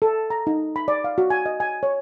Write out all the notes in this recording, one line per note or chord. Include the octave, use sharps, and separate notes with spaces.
A4
A#5
D#4
B5
D5
F5
F#4
G#5
D#5
G#5
C#5